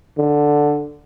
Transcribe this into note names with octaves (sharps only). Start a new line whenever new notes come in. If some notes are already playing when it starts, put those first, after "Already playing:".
D3